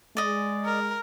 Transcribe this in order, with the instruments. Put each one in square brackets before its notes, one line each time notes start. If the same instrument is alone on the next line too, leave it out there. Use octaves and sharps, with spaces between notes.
[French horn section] G#3 [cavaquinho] D5 D#5
[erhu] A#4